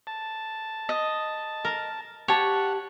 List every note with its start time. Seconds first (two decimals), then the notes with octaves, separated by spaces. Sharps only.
0.07 A5
0.89 D#5
1.65 A#4
2.28 G4 C#5 F#5 A5